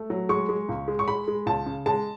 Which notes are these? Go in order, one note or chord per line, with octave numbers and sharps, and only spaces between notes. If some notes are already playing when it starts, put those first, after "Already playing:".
Already playing: A3
F#3
G#3 C#6
G#3
C#2
G#3
C#6
G#3 B5
G#3
C#2 A5
C#3
G#3 A5